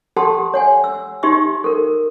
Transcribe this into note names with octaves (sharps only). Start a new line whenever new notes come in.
G4 A4 F#5 A5 C6
C#5 F#5 G#5
E6
D#4 G4 E5 C6 C#6
A4 A#4